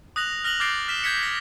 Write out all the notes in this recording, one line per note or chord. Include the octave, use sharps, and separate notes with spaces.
D#6 F#6 A#6 F7 F#7
F6 A#6 F7 F#7
D6 F6 G6 A6 C7 D7
F6 B6 E7 G7
G6 G#6 B6 C#7
A#6